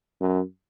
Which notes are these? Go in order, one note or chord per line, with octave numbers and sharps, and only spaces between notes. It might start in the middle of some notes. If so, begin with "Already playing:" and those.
F#2